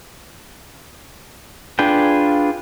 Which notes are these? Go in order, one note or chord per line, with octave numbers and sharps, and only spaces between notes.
D4 F4 G#4 B4 G5